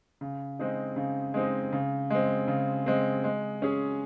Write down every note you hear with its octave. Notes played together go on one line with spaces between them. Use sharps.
C#3
G#3 C4 D#4
C#3
G#3 C4 D#4
C#3
G#3 C4
C#3
G#3 C4
G#3
C#4 G#4